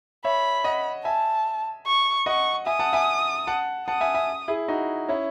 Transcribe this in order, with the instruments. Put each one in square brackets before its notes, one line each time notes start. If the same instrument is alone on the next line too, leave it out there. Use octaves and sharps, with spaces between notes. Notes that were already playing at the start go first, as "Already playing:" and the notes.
[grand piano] C#5 E5 [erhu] B5
[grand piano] D#5 F#5
[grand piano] E5 G#5 [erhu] A5
[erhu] C#6
[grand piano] D#5 F#5 [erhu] C#6
[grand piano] E5 G#5 [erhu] D#6
[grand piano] F#5 A5
E5 G#5
F#5 A5
[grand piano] F#5 A5 [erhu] D#6
[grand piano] E5 G#5
E5 G#5
E4 G#4
D#4 F#4
C#4 E4